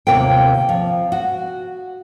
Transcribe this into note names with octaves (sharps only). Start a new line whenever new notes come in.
D#2 C3 A#3 F4 G5
F3
F#4